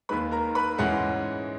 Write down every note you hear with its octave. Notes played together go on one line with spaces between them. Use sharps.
D#2 D#3 G#3 B4 B5
A#4 A#5
B4 B5
G#2 E3 G#3 C#4 F#5 F#6